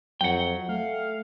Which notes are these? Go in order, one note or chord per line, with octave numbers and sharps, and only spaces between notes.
F2 F#3 F#5 G5
A3 F5